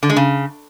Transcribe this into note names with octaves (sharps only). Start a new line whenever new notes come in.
D3
G#3
C#3